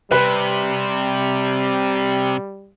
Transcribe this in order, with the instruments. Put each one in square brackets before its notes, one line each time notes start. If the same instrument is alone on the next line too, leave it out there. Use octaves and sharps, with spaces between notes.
[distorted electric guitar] C3 [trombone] G3 [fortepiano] B4